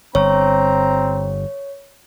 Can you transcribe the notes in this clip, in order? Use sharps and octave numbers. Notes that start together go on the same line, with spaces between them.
G1 C4 C#5 A#5